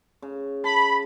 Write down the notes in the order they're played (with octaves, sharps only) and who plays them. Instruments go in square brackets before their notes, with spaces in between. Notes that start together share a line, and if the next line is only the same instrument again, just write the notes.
[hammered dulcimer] C#3
[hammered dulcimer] A5 [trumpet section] B5